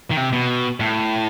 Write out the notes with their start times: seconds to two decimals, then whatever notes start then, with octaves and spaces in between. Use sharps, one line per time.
0.11 D#3
0.17 C3
0.33 B2
0.80 A2